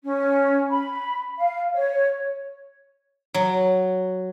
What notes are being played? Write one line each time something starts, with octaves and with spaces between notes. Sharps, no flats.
C#4
B5
F5
C#5
F#3